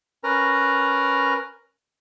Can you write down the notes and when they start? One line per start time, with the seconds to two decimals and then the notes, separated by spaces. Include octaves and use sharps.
0.24 C#4 A#4 B4 A#5